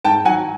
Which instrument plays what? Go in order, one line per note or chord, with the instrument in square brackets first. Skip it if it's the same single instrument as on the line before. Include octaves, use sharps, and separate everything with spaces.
[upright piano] G#2 G5 A5
D#3 F#3 F#5 G#5